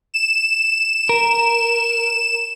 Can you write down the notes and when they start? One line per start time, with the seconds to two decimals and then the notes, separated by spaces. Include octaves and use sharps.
0.14 E7
1.09 A#4